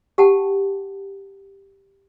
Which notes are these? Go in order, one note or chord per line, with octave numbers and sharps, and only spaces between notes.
G4 F#5 G5 A5